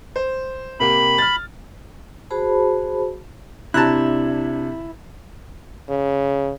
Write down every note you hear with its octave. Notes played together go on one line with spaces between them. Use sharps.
C5
C3 A#3 G4 B5
F6 A6
F#4 G#4 C5 A5 B5
C3 D4 E4 A5 A#5 F#6
C#3